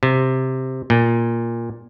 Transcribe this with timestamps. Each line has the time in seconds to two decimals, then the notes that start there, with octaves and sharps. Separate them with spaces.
0.03 C3
0.90 A#2